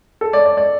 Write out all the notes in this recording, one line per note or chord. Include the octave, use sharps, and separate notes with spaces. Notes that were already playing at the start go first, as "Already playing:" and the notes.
A4
D5
D5
D5